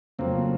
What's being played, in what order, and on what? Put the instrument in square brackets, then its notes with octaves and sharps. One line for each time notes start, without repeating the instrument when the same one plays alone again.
[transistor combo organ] F2 C#3 F#3 A3 [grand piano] A#3 C4